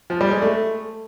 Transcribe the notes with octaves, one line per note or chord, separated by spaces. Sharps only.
F3
G3
G#3
A3